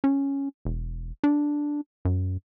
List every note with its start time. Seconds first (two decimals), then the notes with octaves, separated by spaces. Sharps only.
0.04 C#4
0.65 E1
1.24 D4
2.05 F#2